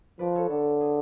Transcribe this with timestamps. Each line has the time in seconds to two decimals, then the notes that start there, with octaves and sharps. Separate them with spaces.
0.19 F3 B4 D5
0.35 A4 C#5
0.50 D3 A4
0.81 G#4